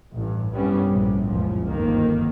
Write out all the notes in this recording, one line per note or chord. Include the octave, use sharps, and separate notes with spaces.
A1 G2
C2 G2 G3 B3 C#4
A#1 A2 C3
F#1 C#2 A#2 F3
G1 F2 D#3 A#3